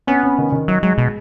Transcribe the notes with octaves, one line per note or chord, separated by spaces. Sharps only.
B3 C#4
C#4
D#3
D#3
F#3 D#4
F#3 G#3
B2